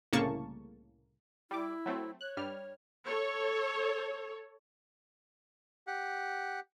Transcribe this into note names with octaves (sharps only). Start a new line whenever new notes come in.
C2 A2 C#3 A#3 A5 C#6
G3 E4 D6
F#3 A3 C4
C#5 F#6
G2 G3 F6
A4 C#5
G4 F#5